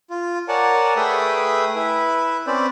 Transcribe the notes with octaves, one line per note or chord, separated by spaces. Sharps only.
F4
A#4 C#5 D5 F#5 G#5 A5
A3 G#4 B4 E5 G5 D#6
E4 B4 E5
C4 C#4 B4 C5 D5